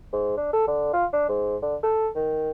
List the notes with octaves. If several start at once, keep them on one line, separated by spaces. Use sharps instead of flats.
G#2
D4
A4
D3
F4
D4
G#2
D3
A4
D#3